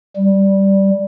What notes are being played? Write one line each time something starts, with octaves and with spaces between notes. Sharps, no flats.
G3